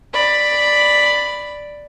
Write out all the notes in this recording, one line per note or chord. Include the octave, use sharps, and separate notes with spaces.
D5 B5